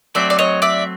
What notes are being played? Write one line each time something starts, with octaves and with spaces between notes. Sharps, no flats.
F#3 A3 C4 D5 E5
D5
C#5 D#5
D5 E5